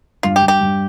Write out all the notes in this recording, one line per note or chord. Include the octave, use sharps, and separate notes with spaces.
G2 F4
G4
G2
G4
G2